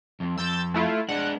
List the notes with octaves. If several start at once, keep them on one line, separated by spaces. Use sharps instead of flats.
F2
F2 E6 G6 A6
A3 E4 F4
G#3 D4 F#5